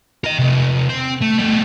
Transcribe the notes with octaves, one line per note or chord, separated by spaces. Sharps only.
A#4 D#5
C3 A3
C4
A3
G3 A3